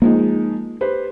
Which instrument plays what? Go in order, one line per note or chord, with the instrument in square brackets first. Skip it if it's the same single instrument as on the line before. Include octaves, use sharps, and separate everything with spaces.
[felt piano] F3 G#3 D#4 [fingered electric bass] A#3
[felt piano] G4 B4 C5